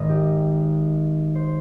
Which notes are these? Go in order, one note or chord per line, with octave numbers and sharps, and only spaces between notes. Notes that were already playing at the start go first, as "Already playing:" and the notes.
Already playing: G#1 G#2 D#3 D#5
G4
C5